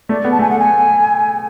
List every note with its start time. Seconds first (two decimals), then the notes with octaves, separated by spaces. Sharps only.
0.09 A3 D5
0.24 B3
0.31 A5
0.39 A3 G#5
0.50 F#5
0.59 G#5